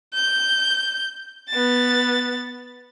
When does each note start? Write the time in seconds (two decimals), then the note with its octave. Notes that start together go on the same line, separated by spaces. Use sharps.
0.14 G6
1.50 B3 A6